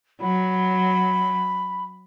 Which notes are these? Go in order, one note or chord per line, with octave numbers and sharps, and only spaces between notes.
F#3 B5